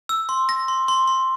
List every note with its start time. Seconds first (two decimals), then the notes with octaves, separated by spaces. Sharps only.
0.09 E6
0.29 C6
0.49 A#6
0.68 C6
0.88 C6
1.07 C6